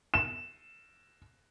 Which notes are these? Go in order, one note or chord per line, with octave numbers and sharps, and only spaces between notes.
E7